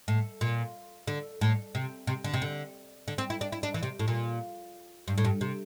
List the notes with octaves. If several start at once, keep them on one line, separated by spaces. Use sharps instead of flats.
A2
A#2
D3
A2
C3
C3
D3
C3
D3
D3
C4
E4
D4
E4
D4
E3
C3
A2
A#2
G2
A2
G2
C3